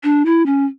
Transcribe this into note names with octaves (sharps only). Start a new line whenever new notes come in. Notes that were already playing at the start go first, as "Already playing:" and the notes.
D4
E4
C#4